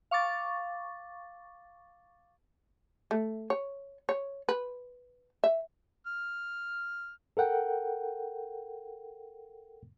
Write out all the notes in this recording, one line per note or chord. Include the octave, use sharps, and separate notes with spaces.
F5 C#6 D6 A6
A3
C#5
C#5
B4
E5
F6
A4 A#4 F#5 G5